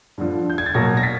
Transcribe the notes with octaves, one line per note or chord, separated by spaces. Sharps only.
G2 D3 F3
G6
G#6
A6
B2 F#3 A#3 G#6 A#6
A#6
A6 B6